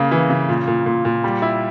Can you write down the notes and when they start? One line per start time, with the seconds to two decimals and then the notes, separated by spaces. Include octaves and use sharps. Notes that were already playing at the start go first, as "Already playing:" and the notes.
Already playing: C#3 A#3
0.11 E3
0.30 C#3
0.49 A#2
0.67 A#2
0.86 A#2
1.05 A#2
1.24 G3
1.42 E4